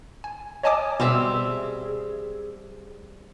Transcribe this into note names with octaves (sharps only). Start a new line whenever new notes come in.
G#5
C#5 D#5 G#5 A5 D6 D#6
B2 G3 C4 G#4 E5